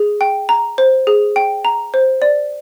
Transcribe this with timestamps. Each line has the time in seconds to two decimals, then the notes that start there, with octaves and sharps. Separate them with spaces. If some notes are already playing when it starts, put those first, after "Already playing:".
Already playing: G#4
0.21 G5
0.49 A#5
0.78 C5
1.07 G#4
1.36 G5
1.65 A#5
1.94 C5
2.22 D5